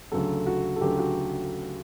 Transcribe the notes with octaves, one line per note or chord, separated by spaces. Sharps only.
D2 C#3 F#3 A4
F#4
A4
D2 C#3 F#3 G4
F#4